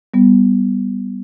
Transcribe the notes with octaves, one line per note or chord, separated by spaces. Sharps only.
G3 B3